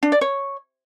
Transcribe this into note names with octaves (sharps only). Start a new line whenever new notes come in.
D4
D5
C#5